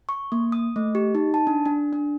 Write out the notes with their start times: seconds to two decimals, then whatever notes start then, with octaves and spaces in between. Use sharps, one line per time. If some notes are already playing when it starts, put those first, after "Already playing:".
0.09 C#6
0.32 A#3
0.52 D#6
0.76 A3
0.95 G4
1.15 D#4
1.34 A5
1.47 D4
1.66 D4
1.93 D4